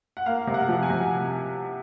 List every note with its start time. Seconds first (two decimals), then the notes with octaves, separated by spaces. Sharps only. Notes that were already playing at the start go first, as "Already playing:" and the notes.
0.17 F#5
0.26 A#3 F5
0.47 C3
0.54 F#5
0.68 F3
0.83 G#5
0.90 C3